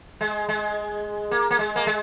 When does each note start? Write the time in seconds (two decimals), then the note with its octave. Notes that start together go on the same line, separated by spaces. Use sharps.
0.21 G#3
0.49 G#3
1.31 A#3
1.50 A#3
1.59 G#3
1.76 A#3
1.87 G#3